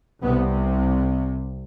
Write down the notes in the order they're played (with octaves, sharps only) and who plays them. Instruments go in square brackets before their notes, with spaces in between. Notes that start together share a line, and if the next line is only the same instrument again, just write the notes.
[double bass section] C2 C3 B3